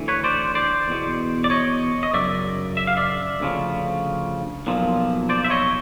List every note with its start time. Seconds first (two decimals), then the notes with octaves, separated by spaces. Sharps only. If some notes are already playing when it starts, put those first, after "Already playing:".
Already playing: D2 E3
0.08 B4 C#5
0.24 C5 D5
0.55 C5 D5
0.88 E2 B2
1.44 D5
1.50 C#5 D#5
2.03 D#5
2.13 F#2 C#3 D5 E5
2.77 E5
2.87 F5
2.97 D5 E5
3.40 D2 C#3 F3
4.67 B1 A#2 F3
5.29 C5 D5
5.44 E5
5.50 C#5 D#5